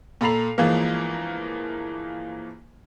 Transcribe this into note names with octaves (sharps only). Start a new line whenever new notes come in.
A#2 A4 A#5 B5 C7 F7
G1 E3 F3 G#3 A#3